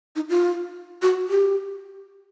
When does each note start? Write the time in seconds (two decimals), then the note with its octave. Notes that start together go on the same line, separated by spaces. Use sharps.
0.16 D#4
0.29 F4
1.02 F#4
1.30 G4